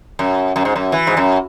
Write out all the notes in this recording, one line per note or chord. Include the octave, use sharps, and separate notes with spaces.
F#2
F#2
G#2
F#2
E3
G#2
F#2